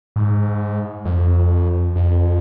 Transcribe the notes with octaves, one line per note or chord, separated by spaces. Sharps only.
G#2
F2
F2